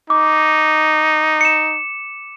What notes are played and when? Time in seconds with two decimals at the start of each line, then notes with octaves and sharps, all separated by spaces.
0.10 D#4 D6
1.41 C#7 E7